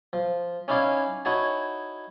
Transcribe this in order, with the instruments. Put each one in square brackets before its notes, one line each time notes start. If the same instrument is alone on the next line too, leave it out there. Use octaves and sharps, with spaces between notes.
[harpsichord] F3
C#4 D#4 E4 D5 F5 G#5
D#4 E4 F#4 C#5 G#5 A5